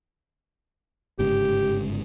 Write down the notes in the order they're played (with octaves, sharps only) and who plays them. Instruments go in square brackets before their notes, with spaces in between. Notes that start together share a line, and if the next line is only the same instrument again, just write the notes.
[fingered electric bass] G1 G#2 C#3 [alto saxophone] G4